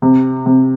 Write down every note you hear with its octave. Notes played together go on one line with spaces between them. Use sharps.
C3
C3